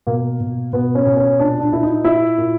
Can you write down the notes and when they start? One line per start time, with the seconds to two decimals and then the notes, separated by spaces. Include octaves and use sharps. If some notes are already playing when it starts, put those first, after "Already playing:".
0.07 B2 A#3
0.40 B2
0.73 B2 B3
0.95 C#4
1.06 B2
1.17 C#4
1.39 A#2 D4
1.60 D4
1.72 A#2 E4
1.83 D#4
2.04 A#2 E4
2.38 A#2